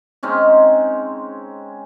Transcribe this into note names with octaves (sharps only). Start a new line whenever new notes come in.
G#3 C4 C#4 D#4